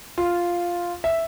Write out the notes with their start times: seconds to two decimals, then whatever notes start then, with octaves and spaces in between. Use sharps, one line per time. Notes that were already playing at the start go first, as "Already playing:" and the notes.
0.18 F4
1.04 E5